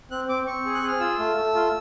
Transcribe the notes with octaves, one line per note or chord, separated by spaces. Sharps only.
C4 F#6
C4 D6
C4 C#6
G#4
F#6
G#4 F6
F4 E6
A3
A3
F4